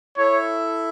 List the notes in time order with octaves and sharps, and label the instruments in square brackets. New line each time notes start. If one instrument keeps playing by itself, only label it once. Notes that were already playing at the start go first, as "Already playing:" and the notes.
[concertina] E4 A4 E5 [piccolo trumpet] C#5